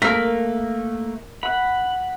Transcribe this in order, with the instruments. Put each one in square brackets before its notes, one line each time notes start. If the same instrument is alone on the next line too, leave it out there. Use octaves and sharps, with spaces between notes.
[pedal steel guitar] A3 A#3 [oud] A#4 [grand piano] B6
[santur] F#5 [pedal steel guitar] B5